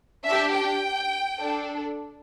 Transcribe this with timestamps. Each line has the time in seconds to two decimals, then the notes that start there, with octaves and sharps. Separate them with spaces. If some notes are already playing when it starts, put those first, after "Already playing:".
0.24 D4 G4 E5
0.53 G5
1.39 D4 A4